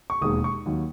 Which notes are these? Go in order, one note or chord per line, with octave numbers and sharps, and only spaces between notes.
C#6
E1 D#2 D#3 G#3 D#6
C#6
D#2 D#3 F#3